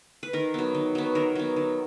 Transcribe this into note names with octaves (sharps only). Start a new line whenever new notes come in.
B4
D#3 A#4
F#3 B3
D#3
F#3 B3
D#3 A#4
F#3 B3
D#3